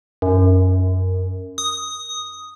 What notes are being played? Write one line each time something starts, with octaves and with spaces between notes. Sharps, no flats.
F#2
D#6